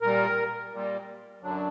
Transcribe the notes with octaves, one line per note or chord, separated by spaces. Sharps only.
A#2 G3 A#4
A#2 G3
F#2 D3 F#3 D4